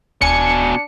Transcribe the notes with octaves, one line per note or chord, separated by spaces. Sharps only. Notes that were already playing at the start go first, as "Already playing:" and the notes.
D#1 B2 D4 G#5 C#7